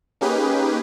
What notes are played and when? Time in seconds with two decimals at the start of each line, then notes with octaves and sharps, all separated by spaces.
0.21 A#3 C#4 D#4 G4 G#4 B4